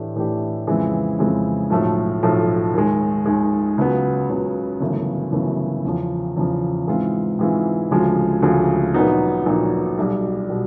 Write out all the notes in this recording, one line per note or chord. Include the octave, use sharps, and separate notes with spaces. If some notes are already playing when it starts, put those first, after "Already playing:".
Already playing: A2 E3 A3 D4 G4
A2 E3 A3 D4 G4
F2 C#3 E3 G#3 C4
F2 C#3 E3 G#3 C4
B1 A2 F3 A3
B1 A2 F3 A3
D#2 D#3 G#3
D#2 D#3 G#3
C#2 C#3 F#3 B3
C#2 C#3 F#3 B3
G1 F#2 C#3 E3 A3
G1 F#2 C#3 E3 A3
E2 C#3 F3
E2 C#3 F3
G#2 E3 G#3 C4 F4
G#2 E3 G#3 C4 F4
D2 C#3 F3 G#3
D2 C#3 F3 G#3
A#1 A#2 F#3 B3 D#4
A#1 A#2 F#3 B3 D#4
B1 B2 G3
B2 G3